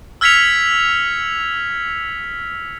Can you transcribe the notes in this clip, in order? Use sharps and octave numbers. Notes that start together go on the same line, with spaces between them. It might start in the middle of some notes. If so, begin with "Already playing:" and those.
E6 F6 G#6 B6 C#7 F7